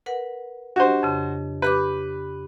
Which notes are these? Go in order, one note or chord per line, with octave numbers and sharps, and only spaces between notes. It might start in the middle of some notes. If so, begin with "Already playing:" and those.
A#4 B4 F#5
D4 F#4 G4 C5 D#5
F2 C#3
G4 B4 B5 D6